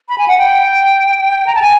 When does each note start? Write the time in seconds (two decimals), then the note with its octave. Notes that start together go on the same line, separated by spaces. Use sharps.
0.09 B5
0.18 G#5
0.28 F#5
0.38 G5
1.46 A#5
1.55 A5
1.62 G#5